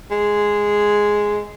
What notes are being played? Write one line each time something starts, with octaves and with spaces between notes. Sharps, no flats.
G#3